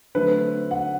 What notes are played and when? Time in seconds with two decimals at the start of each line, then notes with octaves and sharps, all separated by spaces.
0.15 D3 F#3 A3 C4 B4
0.71 F#5